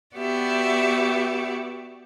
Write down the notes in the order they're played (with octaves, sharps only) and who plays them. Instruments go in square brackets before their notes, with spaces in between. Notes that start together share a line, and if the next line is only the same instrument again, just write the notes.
[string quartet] B3 F#4 G4 D5 E5